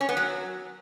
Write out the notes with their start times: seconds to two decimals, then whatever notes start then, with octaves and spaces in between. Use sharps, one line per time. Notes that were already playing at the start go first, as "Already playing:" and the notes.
0.01 C#4
0.09 B3
0.17 F#3